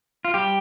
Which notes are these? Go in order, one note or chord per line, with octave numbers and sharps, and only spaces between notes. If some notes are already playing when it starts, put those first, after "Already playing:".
F4
G3 G4